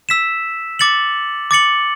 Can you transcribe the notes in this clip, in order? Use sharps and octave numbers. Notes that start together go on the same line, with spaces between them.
E6 B6 E7
D6 A6 C#7 F#7
D6 A6 C#7 F#7